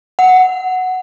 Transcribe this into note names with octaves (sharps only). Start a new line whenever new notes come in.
F#5